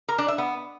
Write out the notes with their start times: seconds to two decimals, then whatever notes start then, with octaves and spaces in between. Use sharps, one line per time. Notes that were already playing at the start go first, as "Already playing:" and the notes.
0.08 A#4
0.18 D4
0.28 E5
0.38 B3